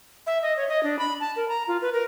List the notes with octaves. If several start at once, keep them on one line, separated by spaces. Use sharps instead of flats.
E5
D#5
C#5
D#5
D4
B5
A5
A#4
A#5
F4
B4
A#4